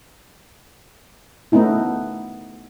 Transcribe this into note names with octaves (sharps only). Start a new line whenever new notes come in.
A3 B3 C#4 D#4 E4